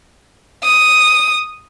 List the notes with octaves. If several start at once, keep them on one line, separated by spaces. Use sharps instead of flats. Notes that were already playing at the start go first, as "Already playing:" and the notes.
D#6